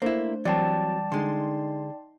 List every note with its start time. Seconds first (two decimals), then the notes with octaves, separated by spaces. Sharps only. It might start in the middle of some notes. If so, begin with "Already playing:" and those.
0.02 A3 A#3 D4 E4 C5
0.45 E3 F#3 G3 C4 D5 G5 A5
1.12 D3 G#3 D#4 C6